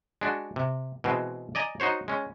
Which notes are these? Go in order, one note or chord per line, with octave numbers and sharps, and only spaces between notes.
G#3 D4 F#4
C3
B2 E3 G#3 C4
D5 D#5 G#5 A#5
D#4 F#4 C5 C#5
G#3 C#4